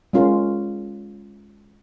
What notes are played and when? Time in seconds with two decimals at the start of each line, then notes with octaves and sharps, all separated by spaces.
0.13 G#3 C#4 F4 A#4